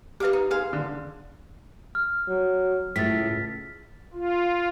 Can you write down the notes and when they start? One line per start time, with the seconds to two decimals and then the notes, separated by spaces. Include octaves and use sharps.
0.20 G4 B4 D#5 F5 D6
0.33 D#4
0.51 G#4 F5 C6
0.73 D3
1.95 F6
2.28 F#3
2.96 C#2 A2 A6 B6
4.13 F4